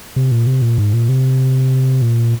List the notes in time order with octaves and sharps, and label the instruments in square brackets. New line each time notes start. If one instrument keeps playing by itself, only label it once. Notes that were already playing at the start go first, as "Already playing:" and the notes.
[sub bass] C3
A#2
C3
A#2
G#2
A#2
C3
A#2